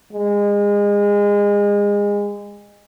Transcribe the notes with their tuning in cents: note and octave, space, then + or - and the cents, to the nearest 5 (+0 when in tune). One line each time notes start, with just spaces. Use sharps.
G#3 -30